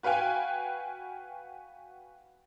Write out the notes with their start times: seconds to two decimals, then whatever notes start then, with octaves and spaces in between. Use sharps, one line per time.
0.03 F#4 B4 F5 G5 G#5